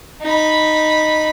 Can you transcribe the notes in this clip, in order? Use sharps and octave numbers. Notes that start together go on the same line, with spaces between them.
D#4 B5